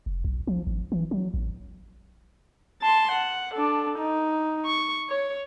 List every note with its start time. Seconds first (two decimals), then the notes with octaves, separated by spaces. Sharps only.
0.06 F1
0.24 B1
0.47 F3
0.67 G#1
0.92 E3
1.11 F#3
1.34 A1
2.81 A5 C6
3.11 F#5
3.54 D4 A4
3.99 D#4
4.65 C#6
5.09 C#5